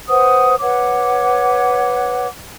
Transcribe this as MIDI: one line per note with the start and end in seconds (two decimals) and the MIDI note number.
0.09 0.55 71
0.09 0.55 72
0.09 0.55 78
0.09 0.55 87
0.60 2.27 71
0.60 2.27 73
0.60 2.27 78
0.60 2.27 86